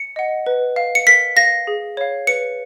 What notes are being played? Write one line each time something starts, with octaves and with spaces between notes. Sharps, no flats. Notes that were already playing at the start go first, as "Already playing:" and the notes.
Already playing: C#7
D#5 F#5
B4
F5
C#7
A#4 B6
F5 A#6
G#4
C#5 F5
B4 C#7